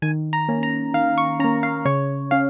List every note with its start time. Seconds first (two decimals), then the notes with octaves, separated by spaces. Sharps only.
0.02 D#3 G#5
0.33 A#5
0.48 A#3 C#4
0.63 A#5
0.94 D#3 F5
1.18 C#6
1.40 C#4 A#5
1.44 A#3
1.63 F5
1.85 C#3 C#5
2.31 C#4 F5